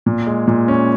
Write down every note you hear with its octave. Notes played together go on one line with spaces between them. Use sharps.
A#2
G#3
A#2
C#4